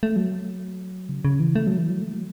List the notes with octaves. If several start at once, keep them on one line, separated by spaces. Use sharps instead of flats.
A3
F#3
C#3
C#3
E3
A3
F#3
E3
F#3
A3
F#3